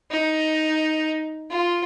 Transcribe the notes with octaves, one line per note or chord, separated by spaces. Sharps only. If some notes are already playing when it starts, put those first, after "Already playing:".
D#4
F4